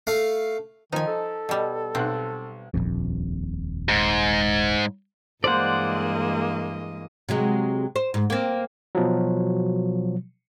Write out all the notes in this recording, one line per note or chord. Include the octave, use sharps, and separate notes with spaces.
A3 F5
D#3 F3 D#4 G#5
A4
B2 G3
B1 C4 F#5 F#6
D#1 A#1 F2
G#2
G2 E3 G#3 A#3 C5 D5 D#5 F#5
C3 F#3 G#3
C5
G#2
A#3 C4
B2 F3 F#3